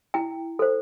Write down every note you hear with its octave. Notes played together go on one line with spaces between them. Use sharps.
E4 G5
A4 C5